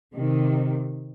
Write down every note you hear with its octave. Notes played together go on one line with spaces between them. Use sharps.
C3 D#3